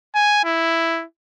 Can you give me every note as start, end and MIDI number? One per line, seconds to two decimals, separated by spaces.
0.15 0.39 80
0.45 1.05 64